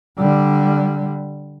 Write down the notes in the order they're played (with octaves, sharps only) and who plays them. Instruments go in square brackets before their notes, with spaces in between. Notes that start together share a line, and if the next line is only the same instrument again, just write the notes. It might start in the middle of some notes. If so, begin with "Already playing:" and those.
[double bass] D3 G3